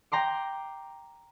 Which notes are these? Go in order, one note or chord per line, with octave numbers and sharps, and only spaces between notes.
G5 A#5 C6 D6